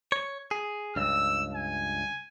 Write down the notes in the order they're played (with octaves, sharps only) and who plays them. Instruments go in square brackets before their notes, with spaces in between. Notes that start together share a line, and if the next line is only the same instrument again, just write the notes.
[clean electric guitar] C#5
G#4
[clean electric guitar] C#2 G2 [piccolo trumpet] E6
[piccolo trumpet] G#5